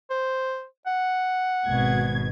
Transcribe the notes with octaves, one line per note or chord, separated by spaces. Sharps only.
C5
F#5
G#1 B2 G#6